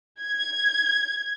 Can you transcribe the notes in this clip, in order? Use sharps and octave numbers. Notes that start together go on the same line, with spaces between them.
G#6